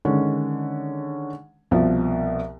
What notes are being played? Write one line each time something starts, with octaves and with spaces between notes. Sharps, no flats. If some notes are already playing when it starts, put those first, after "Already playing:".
D3 D#3 G#3 C#4
C2 B2 F3